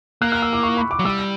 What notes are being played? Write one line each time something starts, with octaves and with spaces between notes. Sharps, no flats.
A#3 F#6
F#6
E6
D6
C#6
B5
D6
F#3
G3 E6